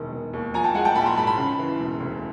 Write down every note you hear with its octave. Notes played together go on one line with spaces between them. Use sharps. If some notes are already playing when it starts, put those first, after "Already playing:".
Already playing: E1 D#3
E1
D#2
F3 G#5 A#5
G5 A5
G#3 F#5 G#5
G5 A5
A#1 A5 B5
A#5 C6
G#2 A5 B5
A5 B5
C#3
E3
E1
D2